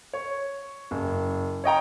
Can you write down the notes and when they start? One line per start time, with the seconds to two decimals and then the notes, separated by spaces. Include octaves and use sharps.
0.13 C#5
0.91 F#1
1.64 C#5 D#5 G5 A#5